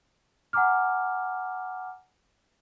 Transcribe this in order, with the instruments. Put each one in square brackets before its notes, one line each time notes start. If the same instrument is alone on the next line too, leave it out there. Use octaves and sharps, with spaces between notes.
[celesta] F#5 G#5 A#5 D6 F6